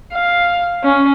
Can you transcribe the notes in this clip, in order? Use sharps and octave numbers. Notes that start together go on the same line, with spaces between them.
F5
C#4